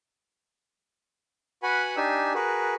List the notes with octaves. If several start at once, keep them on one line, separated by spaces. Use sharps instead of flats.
F#4 B4 F#5 G#5 B5
D4 D#4 G4 G#5 E6
F#4 G#4 A#4 B4